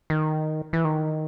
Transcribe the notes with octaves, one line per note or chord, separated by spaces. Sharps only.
D#3
E3
D#3